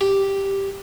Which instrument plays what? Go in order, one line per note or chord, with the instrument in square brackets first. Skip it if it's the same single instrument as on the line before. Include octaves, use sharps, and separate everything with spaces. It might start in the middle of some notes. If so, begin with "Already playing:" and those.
[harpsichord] G4